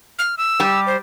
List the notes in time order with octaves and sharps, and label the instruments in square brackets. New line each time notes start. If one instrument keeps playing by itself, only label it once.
[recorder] F6
E6
[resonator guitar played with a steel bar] G3 G4
[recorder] C5